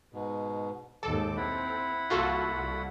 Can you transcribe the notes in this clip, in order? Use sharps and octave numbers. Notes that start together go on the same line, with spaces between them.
G#2 B2
D#2 G#2 A4 D6
C4 E4 F#5 B5
C2 A#3 F4 F#4 A4
C2